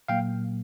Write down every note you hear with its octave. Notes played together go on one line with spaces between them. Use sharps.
A#2 F#3 A#3 F5 G5